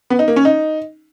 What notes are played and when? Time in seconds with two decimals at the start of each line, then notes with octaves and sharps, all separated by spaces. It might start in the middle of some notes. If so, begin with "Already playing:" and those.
0.10 B3
0.19 D#4
0.28 A#3
0.36 C#4
0.45 D#4